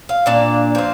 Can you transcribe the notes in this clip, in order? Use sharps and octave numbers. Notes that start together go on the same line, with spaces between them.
F5
A#2 A#3 D4 D5
F3 C4